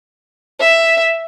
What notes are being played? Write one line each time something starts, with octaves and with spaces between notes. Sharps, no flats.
E5